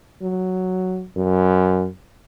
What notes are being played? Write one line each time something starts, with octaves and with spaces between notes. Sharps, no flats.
F#3
F#2